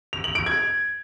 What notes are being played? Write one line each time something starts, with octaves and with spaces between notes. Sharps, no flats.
F7
F#7
D7
G#6